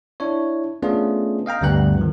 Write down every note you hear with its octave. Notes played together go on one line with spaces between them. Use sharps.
D4 E4 C#5
A3 B3 C#4 D4 F4 G#4
D#5 F5 G5 A#5
D2 G2 G3 B3 F#5 F#6
D#3 F3